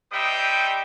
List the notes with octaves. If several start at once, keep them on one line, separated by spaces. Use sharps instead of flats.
G3 D#4 C5 E5 G5 D#6